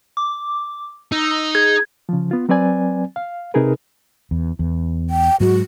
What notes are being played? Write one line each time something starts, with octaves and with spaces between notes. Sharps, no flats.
D6
D#4 E6
G#4 G#6
C#3 F3
B3 F4
F#3 C4 B4 D5 G#5
F5
C3 D#4 G#4 A#4 B4
E2
E2
G5
G#2 F#3 G#3 F#4